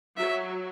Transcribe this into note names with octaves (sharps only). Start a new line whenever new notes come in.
F#3 E5